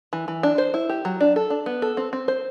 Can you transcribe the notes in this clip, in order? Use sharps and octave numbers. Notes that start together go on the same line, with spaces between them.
E3
E3
D4
C5
E4
G4
F#3
D4
A4
D4
B3
A4
C4
C4
C5